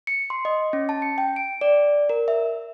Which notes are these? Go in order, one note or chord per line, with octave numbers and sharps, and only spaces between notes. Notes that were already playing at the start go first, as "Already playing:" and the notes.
C#7
C6
D#5
C#4
A5
C#7
G5
D7
D5
A#4
E5